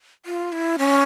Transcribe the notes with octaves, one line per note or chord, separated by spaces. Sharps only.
F4
E4
C#4